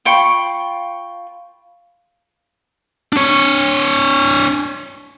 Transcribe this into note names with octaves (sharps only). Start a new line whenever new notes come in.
F4 G5 B5 C#6
D4 C#5